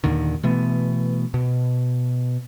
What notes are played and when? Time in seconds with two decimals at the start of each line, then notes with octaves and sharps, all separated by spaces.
0.04 D#2 A#2 D3 D#3
0.43 B2 E3 A3 B3
1.34 B2